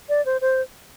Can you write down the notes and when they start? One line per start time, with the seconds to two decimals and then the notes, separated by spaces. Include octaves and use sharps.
0.09 D5
0.26 C5
0.41 C5